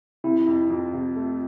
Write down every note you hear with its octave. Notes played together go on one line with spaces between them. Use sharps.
C3 E4
F2
F2 F4
C3
A3